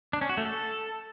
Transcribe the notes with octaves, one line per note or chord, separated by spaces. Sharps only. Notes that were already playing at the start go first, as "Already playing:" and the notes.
D4
C#4
F#4
A3
A4